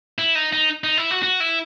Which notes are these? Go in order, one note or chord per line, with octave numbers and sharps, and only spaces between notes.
E4
D#4
D#4
D#4
E4
F#4
F#4
E4